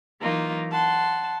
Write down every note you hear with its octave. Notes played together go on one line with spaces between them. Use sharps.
E3 F#3 A#3 D#4 F4
F#5 A5 C6